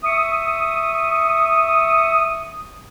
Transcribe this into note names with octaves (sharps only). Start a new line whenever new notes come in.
E5 C#6 D#6